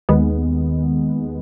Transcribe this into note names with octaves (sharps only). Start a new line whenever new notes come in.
D#2 D#3 G#3 B3